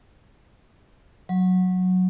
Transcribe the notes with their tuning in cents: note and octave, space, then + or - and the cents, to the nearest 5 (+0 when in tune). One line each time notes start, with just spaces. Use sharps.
F#3 -10